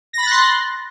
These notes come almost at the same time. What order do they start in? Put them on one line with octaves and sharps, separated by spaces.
A#6 B5 A6 F#6 C6